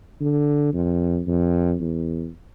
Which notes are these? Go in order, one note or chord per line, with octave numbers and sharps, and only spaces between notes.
D3
F2
F2
E2